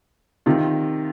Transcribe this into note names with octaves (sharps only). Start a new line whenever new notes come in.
C3 D#3 F4